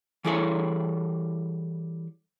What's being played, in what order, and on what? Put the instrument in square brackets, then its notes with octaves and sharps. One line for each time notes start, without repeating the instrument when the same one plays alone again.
[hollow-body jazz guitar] E3 G3 E4 G#4 A4 C#5